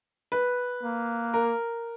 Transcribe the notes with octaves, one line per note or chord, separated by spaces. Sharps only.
B4
A#3
A#4